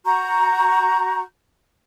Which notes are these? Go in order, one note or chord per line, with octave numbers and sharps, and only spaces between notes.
F#4 A#5 C#6 G6